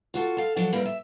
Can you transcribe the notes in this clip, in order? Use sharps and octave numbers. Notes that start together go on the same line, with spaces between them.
F4 F#4 A4
A4 F5
F3 F#3 D4 A4
G3 A#3 C4 E4 B4
E5